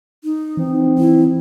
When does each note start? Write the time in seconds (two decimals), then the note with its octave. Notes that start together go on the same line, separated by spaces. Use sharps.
0.24 D#4
0.57 E3 C4
0.98 E3 E4